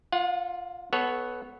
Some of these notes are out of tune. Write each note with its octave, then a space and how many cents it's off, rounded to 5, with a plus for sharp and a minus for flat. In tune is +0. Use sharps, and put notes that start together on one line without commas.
F4 +0 F#5 -40
B3 +0 A4 -25 C#5 +0